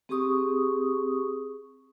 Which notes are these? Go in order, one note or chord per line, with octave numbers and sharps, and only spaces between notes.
C4 G4 G#4 C#6 D#6